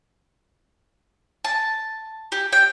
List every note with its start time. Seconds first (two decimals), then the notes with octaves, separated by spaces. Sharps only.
1.45 A5
2.32 G4
2.52 G5